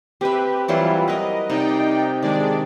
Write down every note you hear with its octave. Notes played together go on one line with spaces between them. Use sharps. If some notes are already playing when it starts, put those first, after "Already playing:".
C4 G4 B4 E5
E3 F#3 G3 E4 F4 C5
A#4 B4 D#5
C3 D#4 D5 G5
D#3 G#3 D4 D5